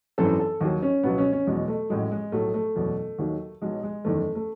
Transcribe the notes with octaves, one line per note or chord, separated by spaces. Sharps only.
G#1 F#2 E3 A4
A4
D#2 D#3 F#3 D#4
C#4
C#2 B2 F#3 B3
C#4
C#4
E2 B2 F#3 G#3
A3
A1 A2 F#3 G#3
G#3
B1 A2 F#3 A3
A3
F#1 E2 B2 F#3
D#2 D#3 F#3
B1 B2 F#3 G#3
G#3
F#1 E2 D#3 A3
A3